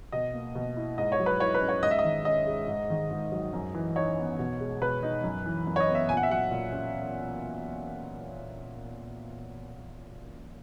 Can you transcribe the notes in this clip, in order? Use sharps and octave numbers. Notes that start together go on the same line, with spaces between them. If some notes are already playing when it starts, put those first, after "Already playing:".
B2 D#5
A#3
B2
E4
G#2 D#5
C#5
F#3
B4
E4 C#5
B4
C#4
C#5
G#2 D#5
E5
D#5
D#3
C#4 D#5
G#3
G#2
D#3
G#2
F#3
F#2
E3
D#4 C#5
B3
B2
G#3
B2 B4
D#4
F#2
E3
F#2
C#5
D#5
B3
E5
A#2 G#5
F#5
E5
F#3 F#5
A#2
C#4